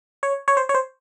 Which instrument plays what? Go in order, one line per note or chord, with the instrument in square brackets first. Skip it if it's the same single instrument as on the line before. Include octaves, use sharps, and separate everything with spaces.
[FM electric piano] C#5
C#5
C5
C#5
C5